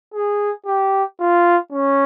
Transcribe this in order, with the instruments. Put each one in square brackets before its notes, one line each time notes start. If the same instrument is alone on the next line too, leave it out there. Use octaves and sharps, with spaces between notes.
[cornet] G#4
G4
F4
C#4